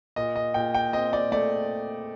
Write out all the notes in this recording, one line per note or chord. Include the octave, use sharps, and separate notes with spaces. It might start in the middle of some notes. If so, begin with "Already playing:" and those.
A#2 D#5
D#5
A#2 G5
G5
C4 D#5
D5
A3 D5